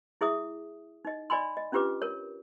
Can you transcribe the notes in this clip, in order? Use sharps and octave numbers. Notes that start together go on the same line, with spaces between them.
E4 G#4 E5 D#6
D#4 D#5
D5 D#5 G#5 B5 C6
D#5
C#4 D4 F4 G4 B4 D6
A#4 C#5